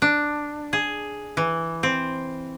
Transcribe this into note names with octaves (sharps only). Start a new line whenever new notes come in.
D4
G#4
E3
C4